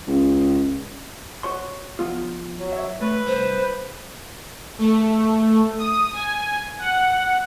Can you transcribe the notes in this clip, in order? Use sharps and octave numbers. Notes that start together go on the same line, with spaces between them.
C#2
F#4 C#5 C6
F3 B3 F4
F#3
C#5 E5
A3 B4
C2 C5
A3
D#6
G#5
F#5